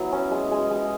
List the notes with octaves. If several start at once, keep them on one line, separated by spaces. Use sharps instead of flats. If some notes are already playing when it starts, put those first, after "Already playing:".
Already playing: F#3 B3 E4 F#4
C#4
G#3
G#3
G#3